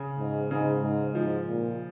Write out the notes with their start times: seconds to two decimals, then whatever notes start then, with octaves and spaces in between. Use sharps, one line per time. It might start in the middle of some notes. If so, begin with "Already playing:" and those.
Already playing: C#3
0.19 G#2
0.51 G#2 C#3
0.82 G#2
1.15 G#2 F3
1.47 A#2